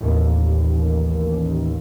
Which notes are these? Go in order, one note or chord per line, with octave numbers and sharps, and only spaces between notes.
A1 D#2